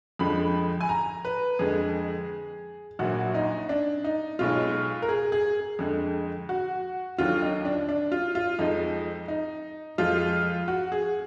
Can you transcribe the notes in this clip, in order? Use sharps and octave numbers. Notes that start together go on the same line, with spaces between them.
F2 D3 F3 G#3 B5
G#5
A#5
B4
F2 D3 G#3 G#4
A#1 A#2 F#3 F#4
D#4
D4
D#4
B1 B2 G#3 F4
A#4
G#4
G#4
F2 D3 G#3
F#4
D#2 D3 F#3 F4
D#4
D4
D4
F4
F4
F2 F3 G#3 D#4
D#4
F2 F3 G#3 F4
F#4
G#4